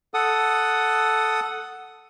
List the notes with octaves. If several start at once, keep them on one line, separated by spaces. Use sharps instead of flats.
A4 F#5 D#6